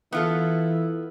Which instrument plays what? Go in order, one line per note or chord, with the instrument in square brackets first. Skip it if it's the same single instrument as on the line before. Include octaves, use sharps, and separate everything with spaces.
[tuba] E3 [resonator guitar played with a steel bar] B3 F4 A4 [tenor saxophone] E4